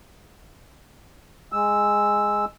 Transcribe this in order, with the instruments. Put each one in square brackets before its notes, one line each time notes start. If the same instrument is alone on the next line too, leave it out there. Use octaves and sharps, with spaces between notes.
[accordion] G#3 E6